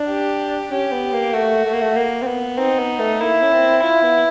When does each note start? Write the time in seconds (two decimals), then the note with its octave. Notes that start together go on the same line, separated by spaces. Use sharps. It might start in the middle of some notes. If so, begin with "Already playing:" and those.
Already playing: D4
0.09 G4
0.71 C#4 G4
0.92 B3
1.13 A#3
1.33 A3 F#4
1.65 A3
1.73 A#3
1.81 A3
1.96 A#3
2.22 C4
2.27 B3
2.58 C4 D#4
2.79 B3
2.99 A3
3.20 A#3 E4
3.42 C#4
3.52 C4
3.82 E4 F4
4.03 B3